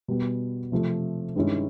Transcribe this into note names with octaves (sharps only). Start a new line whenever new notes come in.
B2 G3 B3
C3 F3 A3
G2 D#3 G#3 C#4 E4